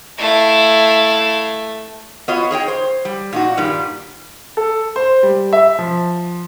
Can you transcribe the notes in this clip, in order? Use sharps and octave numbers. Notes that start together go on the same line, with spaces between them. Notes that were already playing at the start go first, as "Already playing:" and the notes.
A3 E4 F5
B3 F4 F#4 C#5 D#5
G#4 C#5 D#5 G5
C5
G3
A#2 D#4 F#4
G2 A#2 D#3 G3
A4
C5
G3
E5
F3